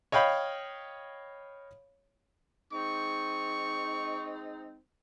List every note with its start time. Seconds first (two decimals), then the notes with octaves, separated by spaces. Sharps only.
0.12 C#5 D#5 F5 G5 B5
2.73 G#3 C4 D#4 C#6